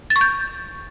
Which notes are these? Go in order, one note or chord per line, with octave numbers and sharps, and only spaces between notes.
A6
C#6
G6